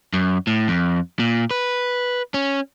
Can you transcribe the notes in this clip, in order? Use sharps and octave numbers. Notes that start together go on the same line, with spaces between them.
F#2
A2
F2
A#2
B4
C#4